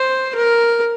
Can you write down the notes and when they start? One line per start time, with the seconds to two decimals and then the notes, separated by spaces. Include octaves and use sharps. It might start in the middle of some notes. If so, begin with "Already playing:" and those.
Already playing: C5
0.35 A#4